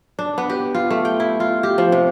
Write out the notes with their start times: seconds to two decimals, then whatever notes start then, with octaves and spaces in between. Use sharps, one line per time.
0.19 D4
0.38 B3
0.50 G4
0.75 F4
0.90 A3
1.05 G5
1.20 E4
1.40 F4
1.63 G4
1.78 F3
1.92 C3